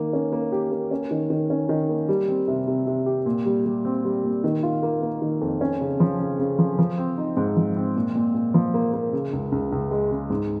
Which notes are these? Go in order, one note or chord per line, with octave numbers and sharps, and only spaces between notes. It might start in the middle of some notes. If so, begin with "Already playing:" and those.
Already playing: D#3 A#3
C#4
A#3
G4
A#3
C#4
D#3
D#3
C#4
D#3
A#3
G3
C4
C3
C3
C3
G4
A#2
G3
G3
C4
G3
A#2
D#3
F4
A#3
A#3
D#3
F2
C#4
C#3
F3
C#3
C#3
F3
F3
C4
D#4
G#2
F3
C4
A#2
A#2
A#2
F3
A#3
A#3
C#3
C#2
C#2
C#2
G#3
C#3
G#2